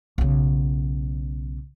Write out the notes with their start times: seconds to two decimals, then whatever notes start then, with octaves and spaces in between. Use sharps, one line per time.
0.18 B1 C#3